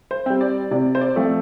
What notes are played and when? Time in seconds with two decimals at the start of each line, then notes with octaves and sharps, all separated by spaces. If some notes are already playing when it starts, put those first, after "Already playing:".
0.11 C5
0.26 G3 C4
0.41 D5
0.71 C3 D5
0.95 C5
1.01 D5
1.16 F3 A3 C4